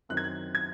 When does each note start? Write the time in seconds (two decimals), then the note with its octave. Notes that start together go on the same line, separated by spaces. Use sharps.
0.09 F#2 D#3 F#3 C4 F#6
0.17 G#6
0.24 F#6
0.55 G#6